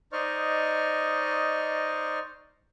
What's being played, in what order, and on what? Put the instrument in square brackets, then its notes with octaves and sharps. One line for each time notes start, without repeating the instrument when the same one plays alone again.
[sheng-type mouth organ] D#4 C5 D5 D#5 C#6 F6